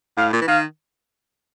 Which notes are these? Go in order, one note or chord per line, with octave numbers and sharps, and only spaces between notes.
A2 F5
A#2
E3
D#3 F5